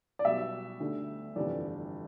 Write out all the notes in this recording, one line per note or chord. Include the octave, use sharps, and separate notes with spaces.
D5
B1 B2 G3 E5
D2 D3 G3
G1 F2 C3 E3 G3 D5